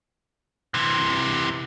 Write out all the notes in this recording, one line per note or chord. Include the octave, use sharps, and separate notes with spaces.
C3 E3